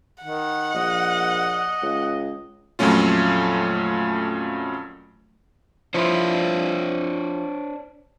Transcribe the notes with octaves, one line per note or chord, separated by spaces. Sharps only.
D#3 F#5
A#1 D#5
C#2
F2 A#2 F#3 A3 C#4 F4
F3 D4 E4 F4 C5 C#5